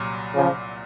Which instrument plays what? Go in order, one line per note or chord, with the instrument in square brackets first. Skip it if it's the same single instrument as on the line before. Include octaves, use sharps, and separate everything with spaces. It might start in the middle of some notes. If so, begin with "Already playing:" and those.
Already playing: [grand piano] C2 A#2 F#3
[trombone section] C#3 F3